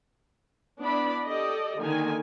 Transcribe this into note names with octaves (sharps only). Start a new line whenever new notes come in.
B3 D4 E4 D5 B5
G4 A4 D5 D#5
D3 D#3 A#3 D#4 G#5